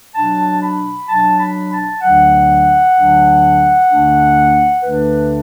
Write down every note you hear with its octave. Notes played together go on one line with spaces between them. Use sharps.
B2 F#3 D4 A5
B5
B2 F#3 D4 A5
B5
A5
D2 D3 F#3 D4 F#5
D2 D3 F#3 D4
D2 D3 A3 D4
D2 D3 A3 D4 B4